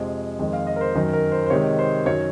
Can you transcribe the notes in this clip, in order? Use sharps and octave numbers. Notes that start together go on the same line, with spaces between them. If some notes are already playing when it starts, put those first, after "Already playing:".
Already playing: F2 C3 F3 G#3
F2 D#3 G#3
F5
D#5
A#4
C5
F#2 D#3 F#3 A#4
A#4
C5
C5
C3 D#3 G#3 C#5
C5
F#2 D#3 F#3 C#5